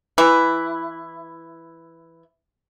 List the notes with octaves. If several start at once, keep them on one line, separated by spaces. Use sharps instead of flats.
E3 E4